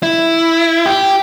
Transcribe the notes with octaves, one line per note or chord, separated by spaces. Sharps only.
E4
G4